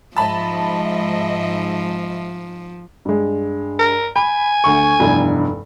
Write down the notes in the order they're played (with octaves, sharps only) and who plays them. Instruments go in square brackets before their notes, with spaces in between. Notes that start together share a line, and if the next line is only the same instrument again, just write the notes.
[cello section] G#2 [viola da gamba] F3 [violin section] D#5 E5 [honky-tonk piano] A5 B5
[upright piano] G2 G#3
[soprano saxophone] A#4
[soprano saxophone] G#5 [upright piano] B5
[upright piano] D2 C#6
F1 E2 G2